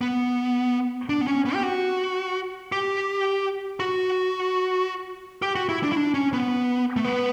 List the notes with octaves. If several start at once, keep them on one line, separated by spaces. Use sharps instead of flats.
B3
D4
B3
C#4
B3
G4
F#4
G4
F#4
G4
F#4
E4
D4
E4
D4
C#4
B3
A3
B3